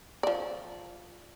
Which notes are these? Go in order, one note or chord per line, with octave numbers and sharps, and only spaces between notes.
F3 D5